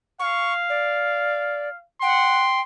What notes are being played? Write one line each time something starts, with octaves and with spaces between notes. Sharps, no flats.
F5 C#6
D5
F#5 G5 C6